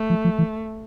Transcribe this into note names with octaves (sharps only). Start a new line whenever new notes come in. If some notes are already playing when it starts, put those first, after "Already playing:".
Already playing: A3
F3
F3
E3